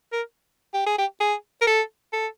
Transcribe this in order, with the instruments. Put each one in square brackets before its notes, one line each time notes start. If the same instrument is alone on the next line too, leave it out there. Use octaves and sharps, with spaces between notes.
[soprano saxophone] A#4
G4
G#4
G4
G#4
A#4
A4
A4